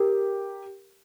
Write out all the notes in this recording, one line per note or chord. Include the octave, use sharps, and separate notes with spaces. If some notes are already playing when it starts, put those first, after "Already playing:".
Already playing: G4 A#4